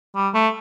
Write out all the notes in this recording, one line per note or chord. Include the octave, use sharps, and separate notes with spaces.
G3
A3